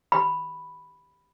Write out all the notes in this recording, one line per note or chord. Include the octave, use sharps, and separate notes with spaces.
B5